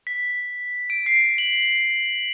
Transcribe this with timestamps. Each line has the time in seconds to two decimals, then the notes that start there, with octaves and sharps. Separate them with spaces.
0.07 B6
0.90 D7
1.06 C7
1.38 F#7